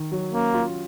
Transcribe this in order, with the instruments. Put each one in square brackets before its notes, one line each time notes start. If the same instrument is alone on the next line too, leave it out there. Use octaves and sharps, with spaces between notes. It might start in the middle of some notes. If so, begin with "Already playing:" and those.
Already playing: [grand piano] D#3
F#3
[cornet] A#3 [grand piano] C#4
[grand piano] F4